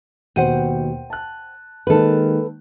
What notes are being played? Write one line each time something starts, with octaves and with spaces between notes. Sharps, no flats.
D#2 B2 C5 F#5 G5 D#7
A5 F#6
D#3 G#3 A#3 A4 B4